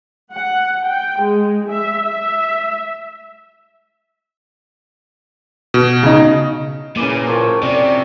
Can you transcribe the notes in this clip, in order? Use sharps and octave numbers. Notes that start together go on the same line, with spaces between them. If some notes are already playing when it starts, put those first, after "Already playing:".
F#5
G5
G#3
E5
E5
B2
C#3 D#4
A#2 C#3 E3 D6
F3 A#4 C#5 G5
C3 D5